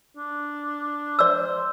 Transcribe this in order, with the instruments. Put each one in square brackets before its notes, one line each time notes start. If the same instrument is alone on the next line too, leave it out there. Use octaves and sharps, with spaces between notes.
[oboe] D4
[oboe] C5 [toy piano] D5 E6